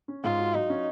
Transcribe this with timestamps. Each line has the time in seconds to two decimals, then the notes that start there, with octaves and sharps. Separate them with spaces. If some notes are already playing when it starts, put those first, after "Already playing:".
0.08 C#4
0.24 G#2 F4
0.39 F#4
0.54 F#3 D#4
0.70 C#4